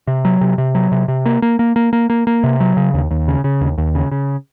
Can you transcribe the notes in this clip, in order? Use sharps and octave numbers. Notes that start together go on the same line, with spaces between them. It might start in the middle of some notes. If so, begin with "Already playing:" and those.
C3
F#3
C3
C3
F#3
C3
C3
A#3
A#3
A#3
A#3
A#3
A#3
A#3
C3
F#3
C#3
D#2
D#2
C#3
C#3
D#2
D#2
C#3
C#3